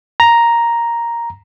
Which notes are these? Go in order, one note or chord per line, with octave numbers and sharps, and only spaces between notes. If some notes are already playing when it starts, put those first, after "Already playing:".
A#5